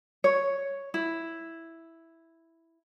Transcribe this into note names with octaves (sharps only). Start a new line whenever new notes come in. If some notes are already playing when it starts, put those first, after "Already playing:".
C#5
E4